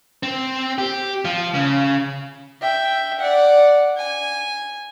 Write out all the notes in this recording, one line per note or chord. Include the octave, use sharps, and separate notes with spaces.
C4
G4
F3
C#3
E5 G5
D5 F#5
G#5